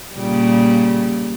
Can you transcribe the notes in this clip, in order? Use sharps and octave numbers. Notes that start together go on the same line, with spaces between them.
A#2 C#3 G3